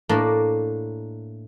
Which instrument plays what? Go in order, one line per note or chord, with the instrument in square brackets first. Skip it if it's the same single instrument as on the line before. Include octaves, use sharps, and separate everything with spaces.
[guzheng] A2 A#3 D4 D5